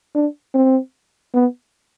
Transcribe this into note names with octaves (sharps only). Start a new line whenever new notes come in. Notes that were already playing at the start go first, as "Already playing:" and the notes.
D4
C4
B3